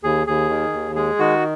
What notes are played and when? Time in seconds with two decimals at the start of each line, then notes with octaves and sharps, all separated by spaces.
0.03 D#2 G#4
0.27 D#2 G#4
0.50 D#3
0.73 D#2
0.96 G#3 G#4
1.19 D#3 F#4